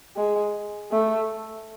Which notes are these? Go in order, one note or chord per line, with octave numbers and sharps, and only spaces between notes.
G#3
A3